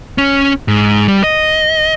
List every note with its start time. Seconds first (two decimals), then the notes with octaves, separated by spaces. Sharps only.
0.18 C#4
0.68 G#2
1.08 G3
1.24 D#5